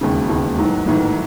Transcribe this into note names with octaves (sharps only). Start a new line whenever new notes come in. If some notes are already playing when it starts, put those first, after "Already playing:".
E1 D#2 C#3
E1 D#2 C#3
A1 G#2 D#3 F#3
A1 G#2 D#3 F#3